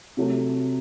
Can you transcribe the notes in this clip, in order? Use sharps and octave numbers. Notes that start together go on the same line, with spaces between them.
C3 F#3 A3